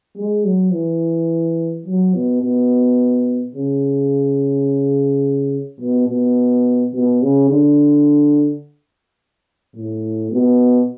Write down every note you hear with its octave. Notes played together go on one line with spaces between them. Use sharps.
G#3
F#3
E3
F#3
B2
B2
C#3
B2
B2
B2
C#3
D3
A2
B2